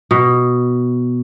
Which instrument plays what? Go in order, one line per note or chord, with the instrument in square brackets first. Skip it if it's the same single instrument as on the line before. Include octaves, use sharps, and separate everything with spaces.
[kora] B2